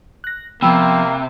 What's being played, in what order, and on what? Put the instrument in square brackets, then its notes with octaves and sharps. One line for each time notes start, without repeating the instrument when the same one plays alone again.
[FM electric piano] F#6 A#6
[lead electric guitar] C3 [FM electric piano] F3 B3 [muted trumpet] A#3 [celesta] G5 B5 E6